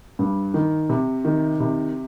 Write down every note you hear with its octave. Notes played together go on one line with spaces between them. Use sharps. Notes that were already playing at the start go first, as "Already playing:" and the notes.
G2
D#3
C3
D#3
C3